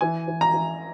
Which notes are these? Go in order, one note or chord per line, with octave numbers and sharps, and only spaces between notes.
E3 G#5
E3
A#5
E3